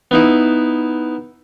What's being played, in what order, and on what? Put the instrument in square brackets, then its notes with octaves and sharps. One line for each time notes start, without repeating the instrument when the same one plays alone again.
[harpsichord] B3 D#4 E4